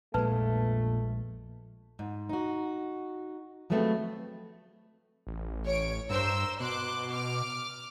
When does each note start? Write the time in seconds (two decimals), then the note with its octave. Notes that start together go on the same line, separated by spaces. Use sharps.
0.14 A#1 F2 A#2 G#3 A3 B4 A5
1.99 G#2
2.29 D#4 F#4
3.70 F3 F#3 G#3 A3 B3 C4
5.27 A1
5.65 C#5 D7
6.10 G2 A#4 C5 E6
6.60 B2 C6 D6 F#6
7.13 D6 F6